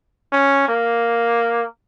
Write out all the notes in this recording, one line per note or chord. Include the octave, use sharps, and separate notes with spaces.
C#4
A#3